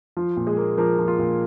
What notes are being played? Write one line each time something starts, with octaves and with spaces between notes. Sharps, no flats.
F3 F4
A#2
G#3 G#4
A#3
F3 A#3 A#4
F3
F4
A#2